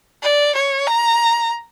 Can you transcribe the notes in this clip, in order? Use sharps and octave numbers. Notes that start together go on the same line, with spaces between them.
D5
C#5
A#5